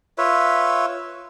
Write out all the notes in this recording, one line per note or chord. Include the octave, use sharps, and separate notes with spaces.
F4 B4 C#5 E5